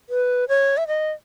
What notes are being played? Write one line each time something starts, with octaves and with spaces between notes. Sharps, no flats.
B4
C#5
E5
D#5